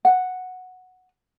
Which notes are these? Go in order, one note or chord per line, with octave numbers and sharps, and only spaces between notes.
F#5